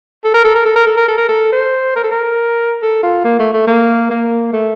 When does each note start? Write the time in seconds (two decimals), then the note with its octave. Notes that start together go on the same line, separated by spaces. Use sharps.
0.25 A4
0.34 A#4
0.45 A4
0.55 A#4
0.66 A4
0.76 A#4
0.87 A4
0.97 A#4
1.08 A4
1.18 A#4
1.29 A4
1.53 C5
1.96 A#4
2.04 A4
2.11 A#4
2.82 A4
3.03 F4
3.25 A#3
3.40 A3
3.54 A3
3.67 A#3
4.11 A#3
4.53 A3